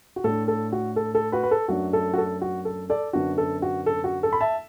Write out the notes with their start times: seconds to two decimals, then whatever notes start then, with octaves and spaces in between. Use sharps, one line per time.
0.16 F#4
0.24 A2 A3 D4 A4
0.48 A4
0.72 F#4
0.96 A4
1.15 A4
1.32 F#4 B4
1.43 B4
1.51 A4
1.68 F#2 F#3 A3 D4 F#4
1.93 A4
2.14 F#4
2.18 A4
2.42 F#4
2.65 A4
2.90 A4 D5
3.13 F#2 D3 B3 D4 F#4
3.38 A4
3.62 F#4
3.86 A4
4.04 F#4
4.23 A4
4.33 B5
4.41 E5 A5